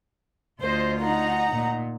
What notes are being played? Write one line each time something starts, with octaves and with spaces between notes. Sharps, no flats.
D2 F4 C5 D#5
D#4 F#5 A#5
A#2